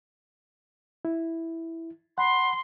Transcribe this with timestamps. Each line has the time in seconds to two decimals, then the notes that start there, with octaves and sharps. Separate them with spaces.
1.05 E4
2.18 F#5 B5 C6